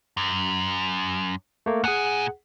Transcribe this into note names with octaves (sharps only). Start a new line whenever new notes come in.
F#2
A3 A#3
A#2 G#4 F#5 G#5